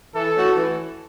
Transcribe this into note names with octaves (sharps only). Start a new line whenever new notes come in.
E3 A4
A3 C#4 F#4
E3